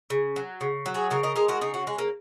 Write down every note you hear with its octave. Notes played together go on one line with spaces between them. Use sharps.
C#3
F#3
C#3
F#3
G#4 C#5
C#3 A#4 D#5
A#4 D#5
G#3 A#4 D#5
F#4 A#4
C#3 D#4 G#4
C#4 F#4
G#3
A#3